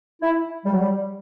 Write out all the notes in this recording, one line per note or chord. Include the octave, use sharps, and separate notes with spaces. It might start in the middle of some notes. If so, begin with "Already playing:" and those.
E4
G3
F#3
G3